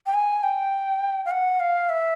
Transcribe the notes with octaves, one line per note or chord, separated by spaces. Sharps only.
G5
G#5
G5
F5
F#5
F5
E5